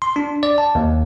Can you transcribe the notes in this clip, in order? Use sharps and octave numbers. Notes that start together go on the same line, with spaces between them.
C6
D4
D5
A5
D#2